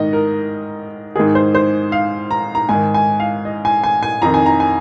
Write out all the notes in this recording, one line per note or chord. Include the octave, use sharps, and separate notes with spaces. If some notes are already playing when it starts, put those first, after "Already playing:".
Already playing: G#2 D#3 D#5
A#4
G#2 D#3 G#4
C5
C5
F5
A#5
A#5
G#2 D#3 G#5
G#5
F5
D#5
G#5
G#5
G#5
F2 D#3 A#5
G#5
A#5
G#5